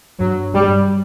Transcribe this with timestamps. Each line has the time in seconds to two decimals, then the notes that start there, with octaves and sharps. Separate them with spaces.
0.20 G2 F#3
0.54 G3